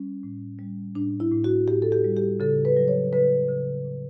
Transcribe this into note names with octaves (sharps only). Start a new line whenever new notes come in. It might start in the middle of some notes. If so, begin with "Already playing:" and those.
Already playing: G3 C#4
A2
G3
A2 D4
E4
A2
F#4
A2 G4
A4
G4
G3
G4
C#3 A4
B4
F#3
C#5
C#3 B4
C#3
A2